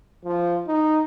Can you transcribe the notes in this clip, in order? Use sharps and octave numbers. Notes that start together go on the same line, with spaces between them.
F3
D#4